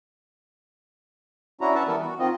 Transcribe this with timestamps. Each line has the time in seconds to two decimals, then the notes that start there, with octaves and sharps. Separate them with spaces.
1.61 C#4 D4 E4 F#4 A#5
1.75 B4 E5 F#5 A5
1.88 E3 G3 B3 E4 A4 A#4
1.99 F#4
2.19 D#3 C4 F4 D#5